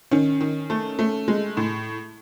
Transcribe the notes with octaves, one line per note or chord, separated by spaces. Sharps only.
D#3 C#4
D#3
A3
A3
G#3
A2